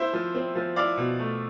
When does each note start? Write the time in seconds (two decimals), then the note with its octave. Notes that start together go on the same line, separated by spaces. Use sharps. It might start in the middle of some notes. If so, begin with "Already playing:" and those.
Already playing: E4 C5 E5
0.13 F3
0.35 C4
0.56 F3
0.76 E4 D5 F5
0.97 B2
1.19 A3